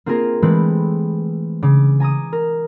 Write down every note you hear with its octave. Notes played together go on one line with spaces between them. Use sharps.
A#3 C4 F4 G#4 A#4
E3 G#3 A3 C4 G4 B4
C#3 D6
G#5 A#5 D6 D#6
A#4